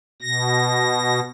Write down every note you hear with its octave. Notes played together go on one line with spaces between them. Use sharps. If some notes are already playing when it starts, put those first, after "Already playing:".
B2 A#6